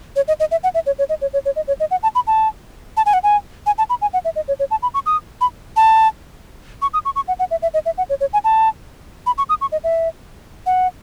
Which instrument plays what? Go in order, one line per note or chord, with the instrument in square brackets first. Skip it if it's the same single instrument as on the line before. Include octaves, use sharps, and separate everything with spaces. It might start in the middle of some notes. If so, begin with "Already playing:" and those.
[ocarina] C#5
D#5
D#5
E5
F#5
E5
C#5
C#5
D#5
C#5
C#5
C#5
D#5
C#5
D#5
F#5
A5
B5
A5
A5
G#5
F#5
G#5
G#5
A5
B5
G#5
F#5
E5
D#5
C#5
C#5
A5
B5
C#6
D#6
B5
A5
C#6
D#6
C#6
C#6
F#5
F#5
E5
E5
D#5
E5
F#5
C#5
C#5
G#5
A5
B5
C#6
D#6
C#6
D#5
E5
F#5